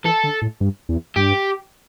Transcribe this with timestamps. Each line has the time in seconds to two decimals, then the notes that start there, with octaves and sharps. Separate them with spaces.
0.04 E3 A4
0.24 D3
0.42 A2
0.61 G2
0.89 E2
1.16 G2 G4